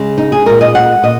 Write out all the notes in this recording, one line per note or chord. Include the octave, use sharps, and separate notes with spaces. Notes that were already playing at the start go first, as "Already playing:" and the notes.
Already playing: C#3 G#3
D#4
G#4
A#2 G#3 A#4
D#5
F#5
A#2 D#5